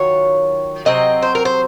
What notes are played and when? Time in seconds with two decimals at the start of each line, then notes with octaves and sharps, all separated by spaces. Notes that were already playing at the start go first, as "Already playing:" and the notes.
Already playing: D#3 F#3 F4 C#5
0.85 C3 F#3 C4 D#5
1.22 C5
1.35 A#4
1.45 C5